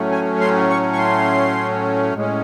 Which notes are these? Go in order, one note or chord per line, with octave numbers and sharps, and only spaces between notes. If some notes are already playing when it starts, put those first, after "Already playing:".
Already playing: A2 F#3 A3 C#4
G#5
C6
C#6
C#6
C6
A2 G#3 C#4